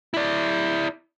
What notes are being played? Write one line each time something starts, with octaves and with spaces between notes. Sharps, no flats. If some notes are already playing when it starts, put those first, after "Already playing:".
E4 D5